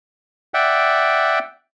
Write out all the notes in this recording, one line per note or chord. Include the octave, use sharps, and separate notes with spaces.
D5 E5 F#5 G5